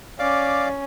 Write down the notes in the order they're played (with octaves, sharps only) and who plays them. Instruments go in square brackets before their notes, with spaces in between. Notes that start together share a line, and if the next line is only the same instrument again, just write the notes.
[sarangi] C#4 [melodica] D5 F5 D6